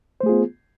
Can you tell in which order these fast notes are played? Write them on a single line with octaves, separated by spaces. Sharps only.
C5 A3 G#4 F4 B3